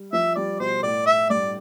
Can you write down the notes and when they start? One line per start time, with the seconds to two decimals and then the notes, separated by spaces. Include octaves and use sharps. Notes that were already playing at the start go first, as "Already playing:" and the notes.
Already playing: G3
0.13 F3 E5
0.36 G3 D5
0.59 B2 C5
0.83 A2 D5
1.07 E5
1.30 G2 D5